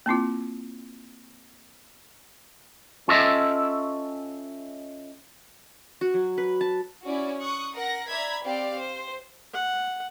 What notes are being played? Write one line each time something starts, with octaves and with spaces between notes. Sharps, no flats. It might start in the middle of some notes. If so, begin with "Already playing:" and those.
A#3 C4 E4 F4
C#4 F4 A4 D#5 E5
F#4
F#3
B4
A5
C#4 E4 F#4 D5
C#6 D#6 F#6
A#4 F#5 A#6
D5 E5 A#5 B5 G#6 B6
C4 G4 D5 F5
C5
F#5